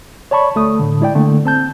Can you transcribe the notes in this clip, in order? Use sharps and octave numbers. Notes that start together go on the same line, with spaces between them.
C#5 D5 A5 B5 C#6
D2 A3 D#6
A2 D3
G#3 E4 D5 G5
D3 A3 A#3
C4 A5 G6